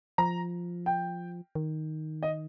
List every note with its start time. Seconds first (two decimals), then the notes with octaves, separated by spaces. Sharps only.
0.18 F3 A#5
0.86 G5
1.55 D#3
2.23 D#5